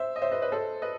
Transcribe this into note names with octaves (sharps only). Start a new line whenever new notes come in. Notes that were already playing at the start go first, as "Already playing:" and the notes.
Already playing: C5 E5
D#5
C5 E5
B4 D#5
B4 D#5
A4 C5
B4 D#5